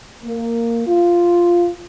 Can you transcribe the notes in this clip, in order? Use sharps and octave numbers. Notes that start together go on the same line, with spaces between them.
A#3
F4